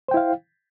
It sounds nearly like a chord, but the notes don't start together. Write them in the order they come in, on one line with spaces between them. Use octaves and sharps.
C5 G5 E4 F5